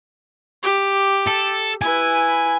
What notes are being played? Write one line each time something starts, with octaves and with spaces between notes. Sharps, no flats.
G4
A4
E4 B4 G#5